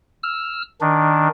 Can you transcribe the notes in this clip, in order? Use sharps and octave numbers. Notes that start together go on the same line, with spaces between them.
E6 F6
D#3 D4